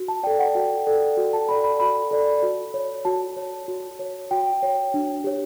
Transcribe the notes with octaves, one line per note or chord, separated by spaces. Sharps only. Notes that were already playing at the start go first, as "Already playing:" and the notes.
Already playing: F#4
A5
A4 D5 G5
F#5
F#4
A4 D5
F#4
A5
A4 D5 B5
B5
F#4 B5
A4 D5
F#4
C#5
F#4 A5
C#5
F#4
C#5
F#4 G5
C#5
D4
G4 C#5